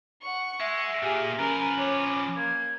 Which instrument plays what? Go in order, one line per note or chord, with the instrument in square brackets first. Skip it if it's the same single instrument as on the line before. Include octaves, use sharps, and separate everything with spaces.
[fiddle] F#5 C#6
[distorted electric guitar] G#3 [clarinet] E5
[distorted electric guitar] A#2 A#3 [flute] G4 [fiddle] G#4
[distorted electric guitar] F3 B4 [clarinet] C#4 [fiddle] A#4 [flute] A#5
[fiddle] C#5 [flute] D6
[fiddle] A#3 [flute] G#6